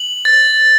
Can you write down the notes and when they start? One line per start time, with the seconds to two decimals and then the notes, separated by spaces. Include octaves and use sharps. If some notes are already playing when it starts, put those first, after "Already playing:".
Already playing: F#7
0.25 A6